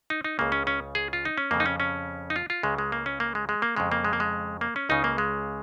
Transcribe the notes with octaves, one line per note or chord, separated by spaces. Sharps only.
D#4
D#4
C#2 C#3 A#3
C#4
C#4
G#4
F4
D#4
C#4
F2 C#3 A#3
D#4
C#4
C#4
D#4
F4
F4
C#2 C#3 G#3
G#3
A#3
C#4
A#3
G#3
G#3
A#3
F2 C#3 G#3
A#3
G#3
A#3
G#3
A#3
C#4
C#2 C#3 D#4
A#3
G#3